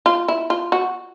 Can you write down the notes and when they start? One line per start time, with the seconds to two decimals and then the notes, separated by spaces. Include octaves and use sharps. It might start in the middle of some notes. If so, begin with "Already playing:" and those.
0.06 F4
0.28 E4
0.50 F4
0.72 F#4